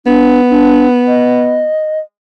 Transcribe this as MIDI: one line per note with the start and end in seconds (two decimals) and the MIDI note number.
0.06 1.68 59
0.06 0.41 62
0.50 0.86 62
1.08 2.00 75